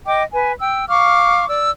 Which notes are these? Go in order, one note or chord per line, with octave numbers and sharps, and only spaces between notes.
D#5 G5 D6
B4 G#5
G5 E6
F5 C#6 D6 F6
D5 E6